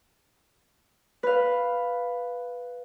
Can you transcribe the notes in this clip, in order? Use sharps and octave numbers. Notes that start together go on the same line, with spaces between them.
B4 F5